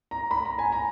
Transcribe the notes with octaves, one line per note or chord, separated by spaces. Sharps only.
A#5
B5
A#5
G#5
A#5